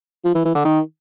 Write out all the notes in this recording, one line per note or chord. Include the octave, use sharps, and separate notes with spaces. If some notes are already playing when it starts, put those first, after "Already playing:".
F3
E3
E3
D3
D#3